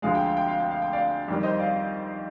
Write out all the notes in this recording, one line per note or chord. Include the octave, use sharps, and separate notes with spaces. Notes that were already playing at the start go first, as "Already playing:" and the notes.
D2 D3 F3 G#3 F5
G5
F5
G5
F5
G5
F5
G5
D5 F5
F2 D#3 G3
C5 D#5
D5 F5